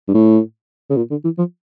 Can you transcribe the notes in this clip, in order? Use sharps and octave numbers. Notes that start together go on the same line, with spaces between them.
G2
A2
C#3
A#2
D3
E3
F3